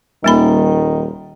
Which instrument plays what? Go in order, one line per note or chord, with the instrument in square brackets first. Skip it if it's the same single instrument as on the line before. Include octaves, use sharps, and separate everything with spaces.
[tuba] D#1 [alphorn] D#3 [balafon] G3 A#3 B5